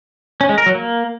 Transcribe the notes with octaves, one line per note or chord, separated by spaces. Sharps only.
C#4
G#3
A#4
F#3
A#3